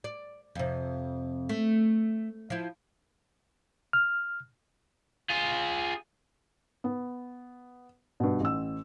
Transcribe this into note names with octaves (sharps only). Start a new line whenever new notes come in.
D5
F2 C3
A3
F3 E4
F6
F4 G#4
B3
G2 B2
A1 E6